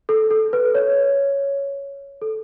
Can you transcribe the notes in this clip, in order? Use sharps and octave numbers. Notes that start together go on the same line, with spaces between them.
A4
A4
B4
C#5
A4